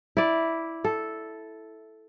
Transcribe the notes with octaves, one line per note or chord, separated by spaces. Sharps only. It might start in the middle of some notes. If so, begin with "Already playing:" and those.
E4 D5
A4